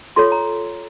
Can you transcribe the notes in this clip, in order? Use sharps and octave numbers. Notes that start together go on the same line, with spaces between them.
F4 A4 C#5 C6
A#5